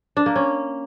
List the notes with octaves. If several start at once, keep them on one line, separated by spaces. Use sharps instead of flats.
D4
A#3
C#4